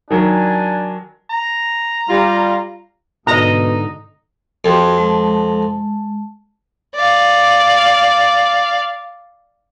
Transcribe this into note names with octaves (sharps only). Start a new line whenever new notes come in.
D#3 F#3 D4 G#5
A#5
G3 F4
G#2 B2 D3 D#4 D#5 A#5
F2 F#4 G4 G5
G#3 A5
D5 F5